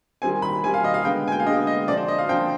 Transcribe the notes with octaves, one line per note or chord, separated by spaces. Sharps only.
D#3 G3 C4 G#5
B5
D#3 G3 C4 G#5
F5
D#5
F5
D3 G#3 B3 G5
G#5
G5
F5
D3 G#3 B3 D#5
D#5
D3 F3 C4 D5
C5
D#5
F5
D3 F3 C4 G5